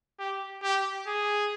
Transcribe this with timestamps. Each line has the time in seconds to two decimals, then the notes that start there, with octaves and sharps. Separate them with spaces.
0.19 G4
0.63 G4
1.07 G#4